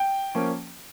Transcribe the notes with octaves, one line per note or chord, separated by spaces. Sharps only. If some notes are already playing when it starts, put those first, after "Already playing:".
Already playing: G5
F3 A#3 C#4